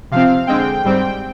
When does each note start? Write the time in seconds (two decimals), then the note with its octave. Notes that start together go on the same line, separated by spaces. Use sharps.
0.11 C3 F3 C4 F5
0.47 D3 G#3 C4 G5
0.84 G#2 G3 C4